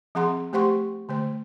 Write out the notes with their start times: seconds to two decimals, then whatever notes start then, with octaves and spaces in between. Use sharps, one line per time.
0.15 F3 C4 G#4 F#5 A#5 C6
0.53 A3 G4 C5 F#5 C6 C#6
1.09 D3 A3 C5